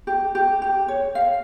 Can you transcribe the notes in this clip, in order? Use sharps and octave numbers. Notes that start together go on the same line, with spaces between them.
G4
G4
G4
C#5
F5